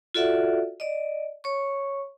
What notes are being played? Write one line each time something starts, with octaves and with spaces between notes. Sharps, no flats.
F4 F#4 A4 D5 E5 F#5
D5 D#5
C#5 C#6